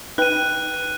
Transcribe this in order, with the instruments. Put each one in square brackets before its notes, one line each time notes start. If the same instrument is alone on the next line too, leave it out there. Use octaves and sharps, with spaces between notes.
[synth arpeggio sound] D#4 B4 G5 [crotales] F#6 D#7